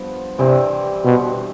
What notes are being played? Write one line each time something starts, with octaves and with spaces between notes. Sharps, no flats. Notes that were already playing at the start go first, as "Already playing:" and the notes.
Already playing: G2 F3 B3
G2 C3 E3 G3 C4
B2